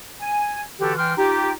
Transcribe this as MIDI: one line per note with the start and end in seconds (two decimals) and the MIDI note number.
0.21 0.61 80
0.80 0.93 50
0.80 0.93 52
0.80 0.93 66
0.80 0.93 67
0.80 0.93 69
0.97 1.13 52
0.97 1.13 79
0.97 1.13 84
0.97 1.13 89
1.18 1.52 63
1.18 1.52 65
1.18 1.52 67